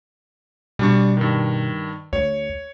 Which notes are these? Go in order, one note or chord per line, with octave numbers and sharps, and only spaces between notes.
B2 G3 D4 C#6
G2 D#3
D2 C#5